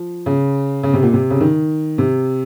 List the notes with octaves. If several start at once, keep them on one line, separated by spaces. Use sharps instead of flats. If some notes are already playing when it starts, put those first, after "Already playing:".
Already playing: F3
C#3
C#3
C3
A#2
C3
C#3
D#3
C3